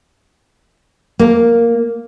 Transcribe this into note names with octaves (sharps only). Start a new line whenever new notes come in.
A#3